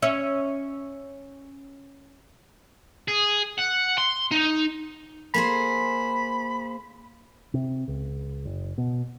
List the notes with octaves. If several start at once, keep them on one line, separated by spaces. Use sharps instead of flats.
C#4 E5
G#4
F#5
C6
D#4
A#3 G#4 C5 B5
C3
C#2
F#1
B2